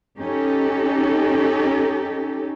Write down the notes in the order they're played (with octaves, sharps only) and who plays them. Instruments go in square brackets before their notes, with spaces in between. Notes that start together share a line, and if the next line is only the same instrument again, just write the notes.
[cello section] C#4 D#4 G4 A4